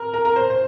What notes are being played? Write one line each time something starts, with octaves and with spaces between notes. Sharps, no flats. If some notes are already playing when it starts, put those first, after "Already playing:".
Already playing: A#4
A#4
A#4
C5
C5